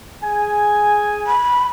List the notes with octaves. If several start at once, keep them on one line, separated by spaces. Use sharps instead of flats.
G#4 G#5
B5